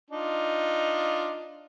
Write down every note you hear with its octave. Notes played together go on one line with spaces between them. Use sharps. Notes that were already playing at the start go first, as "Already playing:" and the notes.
D4 D#4 F4